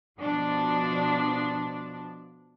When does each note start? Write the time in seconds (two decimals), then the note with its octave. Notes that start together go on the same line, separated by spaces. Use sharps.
0.18 B2 F3 D4